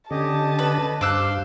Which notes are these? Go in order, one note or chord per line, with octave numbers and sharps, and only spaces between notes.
D3 C#4 G4 D#5 A5
B4
G2 C5 F5 C6 D6 E6 F#6